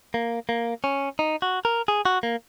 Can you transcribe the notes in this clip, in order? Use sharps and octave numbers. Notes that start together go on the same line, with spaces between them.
A#3
A#3
C#4
D#4
F#4
A#4
G#4
F#4
A#3